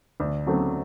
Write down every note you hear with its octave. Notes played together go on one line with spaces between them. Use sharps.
D2
C#3 F#3 A3 C4